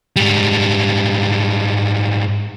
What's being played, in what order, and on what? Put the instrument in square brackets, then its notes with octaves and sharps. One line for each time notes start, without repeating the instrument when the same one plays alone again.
[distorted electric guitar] G#2 G3